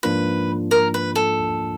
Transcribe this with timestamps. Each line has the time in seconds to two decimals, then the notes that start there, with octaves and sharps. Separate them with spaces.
0.03 G#2 F3 A#3 D4 F4 B4
0.71 A#4
0.94 B4
1.15 A4